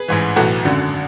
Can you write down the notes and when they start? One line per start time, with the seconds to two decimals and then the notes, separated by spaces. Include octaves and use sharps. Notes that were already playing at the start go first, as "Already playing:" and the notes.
Already playing: G#4 B4
0.08 A1 G#2 E3
0.36 B1 A2 E3 F#4 A4
0.65 G#1 F#2 D3